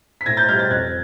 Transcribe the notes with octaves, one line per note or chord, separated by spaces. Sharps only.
B6
A2 G#6 A#6
G6 A6
G3 F6 G6
G6 A6
F2 F#6 G#6